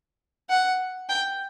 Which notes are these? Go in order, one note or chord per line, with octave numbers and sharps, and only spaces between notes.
F#5
G5